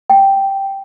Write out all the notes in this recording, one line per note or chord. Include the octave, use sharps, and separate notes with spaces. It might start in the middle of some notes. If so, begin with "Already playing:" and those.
G5